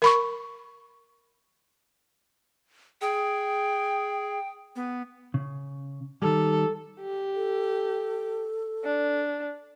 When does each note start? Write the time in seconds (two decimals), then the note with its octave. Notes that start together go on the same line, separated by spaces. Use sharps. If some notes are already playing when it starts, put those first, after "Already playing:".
0.02 A#4 B5 C#6
3.01 G#4 G5
4.76 B3
5.34 C#3
6.22 D#3 G3 A4
7.00 G4
7.35 A4
8.84 D4